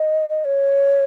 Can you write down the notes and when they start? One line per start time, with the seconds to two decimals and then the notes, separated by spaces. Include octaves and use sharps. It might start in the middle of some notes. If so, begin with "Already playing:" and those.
Already playing: D#5
0.29 D#5
0.45 C#5